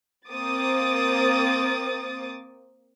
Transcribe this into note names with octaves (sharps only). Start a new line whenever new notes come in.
A#3 C4 C5 D6 D#6 A6